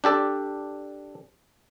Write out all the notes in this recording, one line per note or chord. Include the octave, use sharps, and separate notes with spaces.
D4 G4 A4 D5